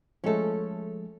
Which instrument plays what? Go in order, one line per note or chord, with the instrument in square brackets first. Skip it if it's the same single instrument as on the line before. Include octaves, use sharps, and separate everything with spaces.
[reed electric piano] F3 G#3 A3 [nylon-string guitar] C#4 A4